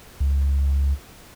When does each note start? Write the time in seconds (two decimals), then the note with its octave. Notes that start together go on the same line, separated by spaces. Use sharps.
0.20 C#2